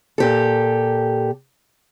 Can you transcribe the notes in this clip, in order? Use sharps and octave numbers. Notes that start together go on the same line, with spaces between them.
A#2 G4 A4